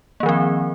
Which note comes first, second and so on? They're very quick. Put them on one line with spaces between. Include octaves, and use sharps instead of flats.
A#3 D#3 F3 C4